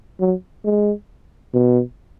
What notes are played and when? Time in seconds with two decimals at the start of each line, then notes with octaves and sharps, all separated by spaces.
0.20 F#3
0.65 G#3
1.54 B2